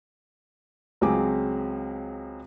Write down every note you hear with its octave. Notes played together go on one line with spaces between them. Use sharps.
C#2 F#3 C4 G#4 D6